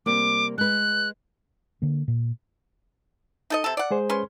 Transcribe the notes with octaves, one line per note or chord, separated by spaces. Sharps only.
C3 G3 A#3 D6
G#3 B4 F#6
D3 A#3
A#2
D#4 A4 D#5
C3 A4
D5 F#5
G#3 G#4 C5
C#4 B4 C6